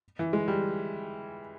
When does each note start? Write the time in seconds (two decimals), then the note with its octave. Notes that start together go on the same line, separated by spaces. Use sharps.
0.19 E3
0.33 G#3
0.48 G3